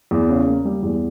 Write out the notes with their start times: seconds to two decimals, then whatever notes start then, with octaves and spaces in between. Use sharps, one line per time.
0.11 E2
0.29 C#3
0.47 A#3
0.65 G3
0.83 E2